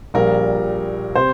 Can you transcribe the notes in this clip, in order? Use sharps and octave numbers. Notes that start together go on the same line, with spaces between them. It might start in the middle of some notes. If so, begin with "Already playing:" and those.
A#1 A#2 G3 A#4
C3 C5